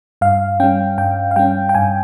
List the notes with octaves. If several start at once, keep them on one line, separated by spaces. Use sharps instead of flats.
G2 F5
G3 C#4 G5
G2 G5
F5
G3 C#4 G5
G5
G2 G#5